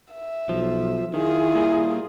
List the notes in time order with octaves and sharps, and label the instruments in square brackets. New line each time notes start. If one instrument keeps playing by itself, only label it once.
[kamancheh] E5
[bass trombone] B1 [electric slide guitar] F3
[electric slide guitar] D#3 [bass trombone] E4 [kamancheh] F4 G#4
[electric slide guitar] A#2 G3 A#3